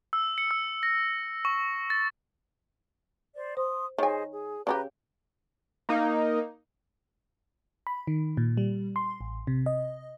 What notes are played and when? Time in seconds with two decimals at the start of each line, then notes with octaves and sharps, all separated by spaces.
0.13 E6
0.38 C#7
0.51 E6
0.83 A#6
1.45 C#6
1.90 A6
3.35 C5 D5
3.57 C5 C6 D#6
3.98 D#3 G#4 C5 C#5 D#5 G#5
4.31 G#4
4.67 C#3 D4 G4 B4 A#5
5.89 A#3 D#4
7.87 B5
8.07 D#3
8.37 A#2
8.57 G3
8.96 C6
9.21 A1
9.47 C3
9.66 D#5